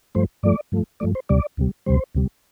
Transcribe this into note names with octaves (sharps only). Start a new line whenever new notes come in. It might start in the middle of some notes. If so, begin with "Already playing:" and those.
G2 F3 A3 C5
G2 F3 A3 D5
G2 F3 A3
G2 F3 A3 D5
C5
D2 C3 G3 D5
D2 C3 G3
D2 C3 G3 C5
D2 C3 G3